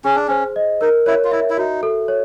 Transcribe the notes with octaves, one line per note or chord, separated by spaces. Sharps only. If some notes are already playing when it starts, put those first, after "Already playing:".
C#4 G#4
D4
C#4 C5
D#5
D#4 A#4
E4 C#5
F4
E4 E5
E4
D#4 F#4
A4
C#5